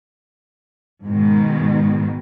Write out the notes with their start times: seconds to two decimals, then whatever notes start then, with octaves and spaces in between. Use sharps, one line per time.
1.06 G#2 B2 D#3 G#3